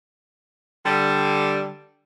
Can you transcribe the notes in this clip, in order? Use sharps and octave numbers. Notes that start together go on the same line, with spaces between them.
D3 G3